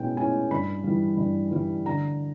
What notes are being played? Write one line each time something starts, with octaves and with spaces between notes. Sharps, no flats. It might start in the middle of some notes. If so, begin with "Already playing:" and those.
Already playing: B2 G#3 C#4 E4 G5
G#3 C#4 E4 G#5
G2 B5
E3 G3
G2
E3 G3
D3 A#5